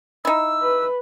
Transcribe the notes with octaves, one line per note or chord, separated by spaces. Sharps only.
D#4 E4 E6
B4